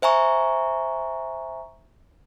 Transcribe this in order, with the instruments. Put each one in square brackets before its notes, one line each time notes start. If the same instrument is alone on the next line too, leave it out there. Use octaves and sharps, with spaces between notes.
[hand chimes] C5 E5 G#5 A#5 C#6